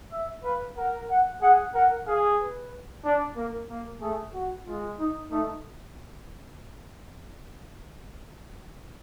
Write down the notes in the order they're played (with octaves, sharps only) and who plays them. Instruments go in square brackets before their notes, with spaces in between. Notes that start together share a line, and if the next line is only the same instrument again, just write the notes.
[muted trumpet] E5
[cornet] B4 [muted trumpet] F5
[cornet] A#4 [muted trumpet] F#5
[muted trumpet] F#5
[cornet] G#4 [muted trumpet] F#5
[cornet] A#4 [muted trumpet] F#5
[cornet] G#4 [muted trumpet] F5
[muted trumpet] B4
[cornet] D4
[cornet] A#3 [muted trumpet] A#4
[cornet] A#3
[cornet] A3 [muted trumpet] G#4
[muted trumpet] F#4
[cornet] G#3 [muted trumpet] F4
[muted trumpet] D#4
[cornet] A3 [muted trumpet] D#4